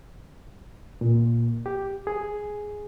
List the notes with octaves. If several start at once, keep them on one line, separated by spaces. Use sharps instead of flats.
A#2
G4
G#4